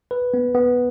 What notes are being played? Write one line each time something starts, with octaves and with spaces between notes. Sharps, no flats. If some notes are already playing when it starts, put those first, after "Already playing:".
B4
B3
B3